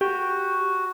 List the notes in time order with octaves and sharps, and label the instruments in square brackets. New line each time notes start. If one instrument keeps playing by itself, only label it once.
[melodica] F#4 [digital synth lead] G4